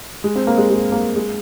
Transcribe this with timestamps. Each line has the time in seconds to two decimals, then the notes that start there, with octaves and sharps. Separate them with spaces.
0.24 G#3
0.36 C4
0.47 A#3
0.58 G#3
0.70 G#3
0.92 A#3
1.16 G#3